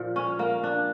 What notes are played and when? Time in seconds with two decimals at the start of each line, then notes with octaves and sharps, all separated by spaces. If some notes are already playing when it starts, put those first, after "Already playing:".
Already playing: A#2 F3
0.16 C#4
0.39 A#3
0.64 D4